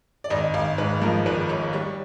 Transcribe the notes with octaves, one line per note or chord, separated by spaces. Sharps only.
D5
G#1 D#5
G#1 F5
G#2 B4
F3 A#4
G#1 B4
G#1 C#5
G3 C#5